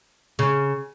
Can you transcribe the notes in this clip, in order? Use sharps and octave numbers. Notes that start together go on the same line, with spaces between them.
C#3